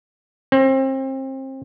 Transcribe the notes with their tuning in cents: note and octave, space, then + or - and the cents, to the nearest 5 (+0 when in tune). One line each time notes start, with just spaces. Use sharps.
C4 +30